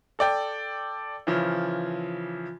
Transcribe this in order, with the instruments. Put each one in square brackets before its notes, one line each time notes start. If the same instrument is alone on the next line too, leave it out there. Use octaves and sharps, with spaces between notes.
[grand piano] A4 D5 G5
C#3 E3 F3